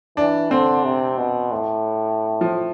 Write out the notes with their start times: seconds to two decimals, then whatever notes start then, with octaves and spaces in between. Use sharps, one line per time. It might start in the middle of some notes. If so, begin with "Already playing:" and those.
0.17 E3 D4
0.51 D3 C4
0.85 C3
1.17 B2
1.52 A2
2.41 F3